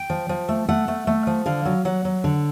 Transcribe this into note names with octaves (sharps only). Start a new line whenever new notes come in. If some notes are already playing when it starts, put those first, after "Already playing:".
Already playing: G5
F3
F3
A3
A3 F#5
A3
A3
F3
D3 F5
F#3
F#3 F#5
F#3
D3